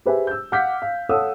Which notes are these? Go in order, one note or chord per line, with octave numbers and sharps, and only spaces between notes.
G4 G#4 B4 C5 E5 G#5
E6 G6
F5 F#5 D6 F6 G6 B6
F5
A4 C#5 F5 F#5 D#6 E6